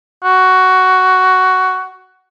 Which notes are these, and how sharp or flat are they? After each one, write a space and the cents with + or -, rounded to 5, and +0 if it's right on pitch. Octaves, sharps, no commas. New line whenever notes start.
F#4 +10